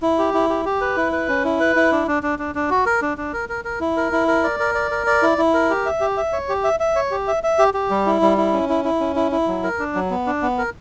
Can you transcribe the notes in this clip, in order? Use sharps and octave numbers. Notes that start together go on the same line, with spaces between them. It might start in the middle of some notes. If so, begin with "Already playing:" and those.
E4
G4
E4
G4
G4
B4
E4
B4
C#4
E4
B4
E4
D4
D4
D4
D4
D4
F#4
A#4
D4
D4
A#4
A#4
A#4
E4
A#4
E4
A#4
D5
A#4
D5
A#4
D5
E4
E4
A#4
G4
E5
G4
E5
C#5
G4
E5
E5
C#5
G4
E5
E5
G4
G4
G3
E4
G3
E4
C#4
E4
E4
C#4
E4
E4
F#3
A#4
D4
F#3
B3
D4
B3
A#4